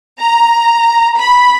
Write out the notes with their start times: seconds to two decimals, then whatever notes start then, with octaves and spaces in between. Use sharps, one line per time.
0.19 A#5
1.15 B5